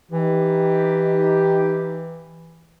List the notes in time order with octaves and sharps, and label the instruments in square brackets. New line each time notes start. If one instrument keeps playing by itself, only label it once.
[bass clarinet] E3 [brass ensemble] D#4 G4